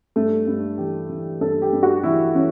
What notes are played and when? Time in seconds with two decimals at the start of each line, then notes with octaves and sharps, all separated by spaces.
0.16 G2 A3
0.47 G2
0.78 E3 G4
1.09 E3
1.41 G2 A4
1.62 G4
1.73 G2
1.83 F#4
2.04 E3 E4
2.35 E3 C#4